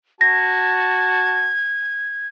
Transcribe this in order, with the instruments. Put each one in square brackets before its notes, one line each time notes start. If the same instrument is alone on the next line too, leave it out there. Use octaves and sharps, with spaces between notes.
[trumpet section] F#4 A5 [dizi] G#6 [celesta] A#6